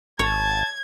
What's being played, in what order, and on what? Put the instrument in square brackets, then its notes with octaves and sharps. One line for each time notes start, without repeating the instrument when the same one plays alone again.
[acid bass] G#1 [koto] C#5 [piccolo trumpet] A5 [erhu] G#6